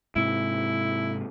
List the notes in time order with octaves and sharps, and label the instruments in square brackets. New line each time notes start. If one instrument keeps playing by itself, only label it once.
[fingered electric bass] G#2 C3 [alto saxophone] E4